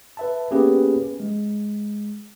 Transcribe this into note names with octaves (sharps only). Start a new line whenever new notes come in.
B4 E5 A5
A#3 B3 C#4 G4 G#4 B4
G#3